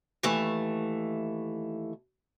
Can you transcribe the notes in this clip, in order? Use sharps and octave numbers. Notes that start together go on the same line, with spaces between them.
D#2 E3 A3